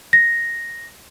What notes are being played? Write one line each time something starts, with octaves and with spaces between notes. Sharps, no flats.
A#6